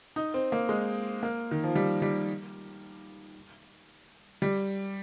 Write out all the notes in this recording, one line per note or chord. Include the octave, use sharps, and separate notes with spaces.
D#4
C4
A#3
G#3
A#3
D#3
F3
G3
G3
G3